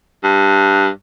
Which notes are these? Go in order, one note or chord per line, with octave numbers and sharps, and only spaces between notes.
G2